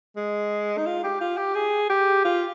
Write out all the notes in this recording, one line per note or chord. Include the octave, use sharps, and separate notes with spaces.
G#3
D#4
F4
G4
F4
G4
G#4
G4
F4